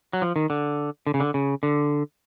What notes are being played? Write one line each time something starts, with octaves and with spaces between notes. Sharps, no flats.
F#3
F3
D#3
D3
D3
C#3
D3
C#3
D3